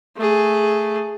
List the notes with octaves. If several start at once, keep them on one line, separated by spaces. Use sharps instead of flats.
A3 G#4